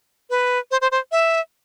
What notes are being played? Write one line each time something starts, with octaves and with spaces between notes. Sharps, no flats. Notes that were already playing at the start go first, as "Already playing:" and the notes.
B4
C5
C5
C5
E5